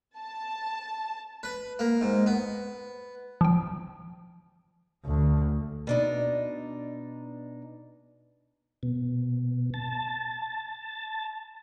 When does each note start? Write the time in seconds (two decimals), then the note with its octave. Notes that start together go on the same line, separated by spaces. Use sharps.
0.17 A5
1.43 B4
1.79 A#3
2.01 G#2
2.26 B3
3.41 F3 G5
5.05 D2
5.87 B2 D4 D#4
8.83 B2
9.74 A5